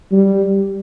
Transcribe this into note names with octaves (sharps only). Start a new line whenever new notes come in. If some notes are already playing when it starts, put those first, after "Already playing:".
G3